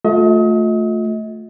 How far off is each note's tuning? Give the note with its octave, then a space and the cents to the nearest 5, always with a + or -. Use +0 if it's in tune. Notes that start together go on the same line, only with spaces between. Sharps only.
A3 +0 F4 +35 D#5 +35